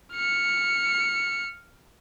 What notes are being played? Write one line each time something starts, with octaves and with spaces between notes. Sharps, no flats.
F6 C#7